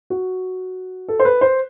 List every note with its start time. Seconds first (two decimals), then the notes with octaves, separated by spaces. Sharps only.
0.10 F#4
1.08 A4
1.19 C5
1.25 B4
1.41 C5